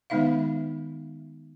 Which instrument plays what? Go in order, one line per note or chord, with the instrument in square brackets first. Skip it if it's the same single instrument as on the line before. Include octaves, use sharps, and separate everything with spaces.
[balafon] D#3 G#3 B3 D#4 E5 F5